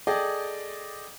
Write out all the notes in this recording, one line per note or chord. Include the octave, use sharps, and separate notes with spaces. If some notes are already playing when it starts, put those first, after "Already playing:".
G#4 A4 D5 D#5 G5